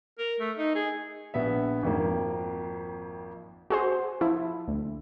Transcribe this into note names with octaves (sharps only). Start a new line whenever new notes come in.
A#4
A3
D#4
G#4
A#1 B3 E5
G#1 F2 A#3
F#4 G#4 C5
F3 E4
D2